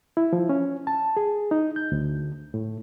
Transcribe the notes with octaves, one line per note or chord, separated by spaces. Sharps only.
E4
F3
C#4
A5
G#4
D#4
G6
D2
A2